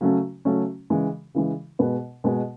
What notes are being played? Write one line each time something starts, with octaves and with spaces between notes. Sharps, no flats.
C#3 F#3 A3 C#4
C#3 F#3 A3 C#4
C#3 E3 G#3
C#3 E3 G#3
B2 G#3 B3
B2 G#3 B3